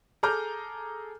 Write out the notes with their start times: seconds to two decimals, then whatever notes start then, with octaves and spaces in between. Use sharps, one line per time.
0.23 G#4 A4 A#5 D6 F6 G6